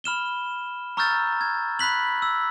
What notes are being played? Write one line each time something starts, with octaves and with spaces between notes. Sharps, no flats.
B5 F6 E7 G7
A#5 C#6 E6 F6 G6 A6
G#6
B5 F#6 B6 F#7
E6